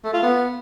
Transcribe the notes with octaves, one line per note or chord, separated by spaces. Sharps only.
A3
F4
B3